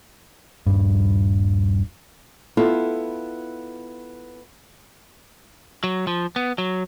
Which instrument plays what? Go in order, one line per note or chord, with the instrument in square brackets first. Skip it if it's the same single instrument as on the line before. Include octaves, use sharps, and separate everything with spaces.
[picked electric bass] D#1 G#1 G2
[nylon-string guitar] B3 E4 F4 A4
[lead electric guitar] F#3
F3
B3
F#3